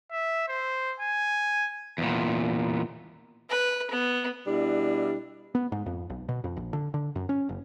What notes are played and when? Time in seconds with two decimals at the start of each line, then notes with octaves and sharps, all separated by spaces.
0.11 E5
0.48 C5
1.00 G#5
1.98 E2 A#2
3.50 B4
3.91 B3
4.47 B2 G3 D4 E4
5.55 B3
5.72 G#2
5.86 F2
6.10 B1
6.29 B2
6.44 F2
6.56 A#1
6.73 D3
6.94 D3
7.15 F#2
7.29 C#4
7.49 F#1